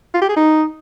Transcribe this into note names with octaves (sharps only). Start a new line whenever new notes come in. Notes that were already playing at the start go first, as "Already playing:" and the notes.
F4
G4
G#4
D#4